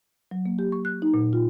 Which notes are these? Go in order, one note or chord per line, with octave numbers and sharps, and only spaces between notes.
F#3
A#3
G4
C#6
F#6
D#4
A#2
F4